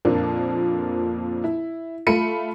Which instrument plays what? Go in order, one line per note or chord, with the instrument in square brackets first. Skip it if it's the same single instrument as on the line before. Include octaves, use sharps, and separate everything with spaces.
[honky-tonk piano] F2 A#2 F3 A#3 D4
E4
A3 F4 B5 C#7 D#7